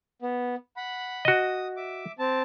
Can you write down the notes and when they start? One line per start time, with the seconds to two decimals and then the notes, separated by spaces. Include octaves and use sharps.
0.22 B3
0.77 F#5 B5
1.25 F#4 D#5 D#6
1.77 E5 D6
2.19 C4 A5